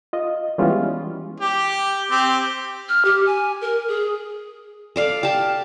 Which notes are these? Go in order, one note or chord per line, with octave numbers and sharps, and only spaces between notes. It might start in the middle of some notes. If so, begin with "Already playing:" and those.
F4 D#5
E3 G3 G#3 B3 C#4 F4
G4
C4 G4
F6
G4
G#5
A#4
G#4
A4 D5 F5
G4 A5